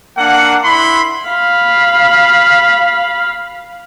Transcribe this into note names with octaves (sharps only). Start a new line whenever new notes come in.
A#3 D4 F#5
E4 B5 C6
F5 B5